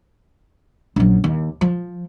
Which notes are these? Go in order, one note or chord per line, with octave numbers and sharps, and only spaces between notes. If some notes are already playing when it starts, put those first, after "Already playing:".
A#1 F#2
D#2
F3